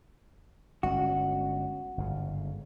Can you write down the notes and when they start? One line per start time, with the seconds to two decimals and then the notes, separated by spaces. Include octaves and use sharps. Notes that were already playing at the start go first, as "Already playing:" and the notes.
0.83 G1 G#3 C#4 F#4
1.98 G1 G#2 C#3